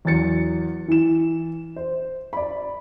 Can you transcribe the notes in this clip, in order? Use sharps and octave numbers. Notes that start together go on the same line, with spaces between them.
E2 F#3 A6 C#7
E3 E7
C5
D5 B5